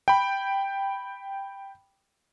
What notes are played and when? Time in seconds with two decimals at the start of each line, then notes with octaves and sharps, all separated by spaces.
0.08 G5 B5